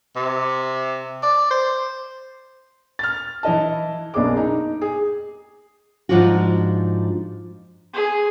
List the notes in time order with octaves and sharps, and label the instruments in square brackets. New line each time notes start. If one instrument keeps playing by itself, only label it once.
[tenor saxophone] C3
D5
C5
[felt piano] F6 A6
E3 E4 D#5 A5
F#1 B1 D4 G#4 D6
D#4
G#4
[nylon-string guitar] G#2 D3 F3 D4 F4 F#4
[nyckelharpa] G#4